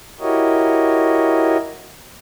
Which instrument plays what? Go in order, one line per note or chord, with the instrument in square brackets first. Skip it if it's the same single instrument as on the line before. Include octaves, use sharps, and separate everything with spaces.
[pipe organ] E4 F#4 G4 A#4 C#5 D#5